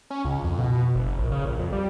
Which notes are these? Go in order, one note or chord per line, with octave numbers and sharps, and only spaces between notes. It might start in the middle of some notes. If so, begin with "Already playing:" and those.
C#4
C#2
F2
B2
F#1
A#1
C#3
A#1
F2
G3